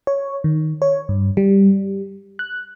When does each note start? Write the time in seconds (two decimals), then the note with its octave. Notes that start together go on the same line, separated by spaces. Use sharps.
0.07 C#5
0.44 D#3
0.82 C#5
1.09 G2
1.37 G3
2.39 F#6